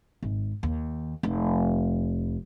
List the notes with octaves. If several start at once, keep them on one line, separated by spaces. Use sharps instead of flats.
G#1
D#2
F1